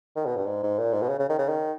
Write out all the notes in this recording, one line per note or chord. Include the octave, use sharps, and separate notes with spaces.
D#3
B2
G2
G#2
G#2
A#2
G#2
B2
C#3
C#3
D#3
C#3
D#3